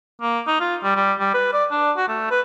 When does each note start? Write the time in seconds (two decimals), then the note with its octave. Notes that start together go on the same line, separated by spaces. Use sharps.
0.22 A#3
0.47 D#4
0.60 F4
0.83 G3
0.95 G3
1.19 G3
1.34 B4
1.53 D5
1.71 D4
1.97 F#4
2.08 A3
2.31 B4